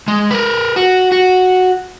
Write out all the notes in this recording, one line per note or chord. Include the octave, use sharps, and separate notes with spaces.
G#3
A#4 B4
F#4
F#4